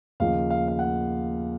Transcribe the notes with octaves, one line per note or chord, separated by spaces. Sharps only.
D#2 C#3 F3 F5
F5
F5
F#5